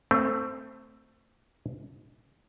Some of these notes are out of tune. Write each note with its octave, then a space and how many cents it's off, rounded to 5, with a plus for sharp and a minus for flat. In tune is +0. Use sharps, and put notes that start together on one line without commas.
A3 +20 C4 +0